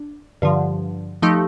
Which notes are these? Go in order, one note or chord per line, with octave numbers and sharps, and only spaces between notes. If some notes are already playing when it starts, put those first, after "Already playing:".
Already playing: D4
G2 D3 F3
F3 A3 D#4 G4